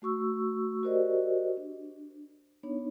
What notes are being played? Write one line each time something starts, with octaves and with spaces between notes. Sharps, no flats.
A3 F#4 C#6 E6
F#4 G4 A#4 C5 D5 D#5
D4
B3 D4 D#4 C#5